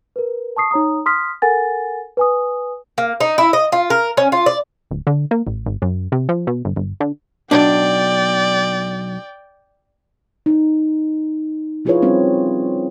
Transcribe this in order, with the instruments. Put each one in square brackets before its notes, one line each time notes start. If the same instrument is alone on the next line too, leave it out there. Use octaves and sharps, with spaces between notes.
[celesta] A#4 B4
A5 C#6 D#6 C7
D#4 C#5 A#5 D#6
C6 D#6 F6 B6
A4 A#4 F#5 G#5 A6
B4 G#5 D#6
[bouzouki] A#3
D#4
E4
D#5
F4
A#4
C#4
F4
D5
[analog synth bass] D1
D3
A#3
A1
G#1
F#2
C3
F3
B2
G1
G1
D3
[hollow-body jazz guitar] B1 D4 [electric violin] D5 G5
[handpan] D#4
F3 E4 F4 G#4 B4 C#5
G3 C4 C#4